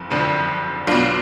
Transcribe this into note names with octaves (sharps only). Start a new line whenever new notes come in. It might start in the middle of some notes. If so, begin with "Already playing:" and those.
Already playing: F#1 F2
F#1 F2 D3 F3
B1 B2 D4 F4